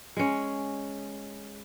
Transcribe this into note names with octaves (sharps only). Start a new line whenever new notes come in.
G#3 C#4